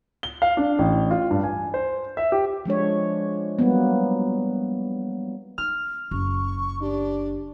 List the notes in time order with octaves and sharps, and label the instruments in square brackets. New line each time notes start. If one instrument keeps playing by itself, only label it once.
[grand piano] G7
F5
D4
A1
F4
G2
G#5
C5
E5
G4
[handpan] F3 G#3 D4 C#5
F#3 G3 A#3 B3
[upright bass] D#4 [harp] F6
[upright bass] F#1 [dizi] C#6
[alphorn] D4 [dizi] G4